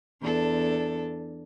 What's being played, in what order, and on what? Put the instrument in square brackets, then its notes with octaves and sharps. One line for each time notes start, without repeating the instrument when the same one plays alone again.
[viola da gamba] E2 D4 A4